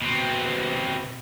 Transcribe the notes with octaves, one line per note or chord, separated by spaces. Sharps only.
B2 C4